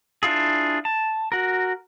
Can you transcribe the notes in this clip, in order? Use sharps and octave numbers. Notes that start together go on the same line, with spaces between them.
D4 E4 F4 G#4
A5
F#4 A#4